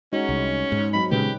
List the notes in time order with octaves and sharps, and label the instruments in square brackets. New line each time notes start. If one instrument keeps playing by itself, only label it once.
[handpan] G#3 D#4 F#4 [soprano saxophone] C#4
[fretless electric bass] C2
G#2
[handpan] F#3 C4 D#4 [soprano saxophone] B5
[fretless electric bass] A#2 C#3 G#3 [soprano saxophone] G4 [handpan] B4